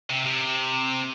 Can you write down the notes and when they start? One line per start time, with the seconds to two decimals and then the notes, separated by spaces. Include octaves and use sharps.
0.10 C3
0.26 C3